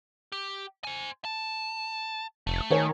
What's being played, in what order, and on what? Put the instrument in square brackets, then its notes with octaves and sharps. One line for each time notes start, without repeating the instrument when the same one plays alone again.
[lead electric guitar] G4
C5 G#5
A5
[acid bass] F1 [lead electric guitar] A3
[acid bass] D#3 [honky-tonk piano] A#4 C#5 G#5